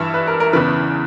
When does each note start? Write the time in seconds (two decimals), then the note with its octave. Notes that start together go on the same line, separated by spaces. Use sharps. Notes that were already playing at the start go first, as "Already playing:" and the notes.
Already playing: G2 E3 E5
0.14 B4
0.27 A#4
0.40 A#4
0.53 E2 C#3 E3 B4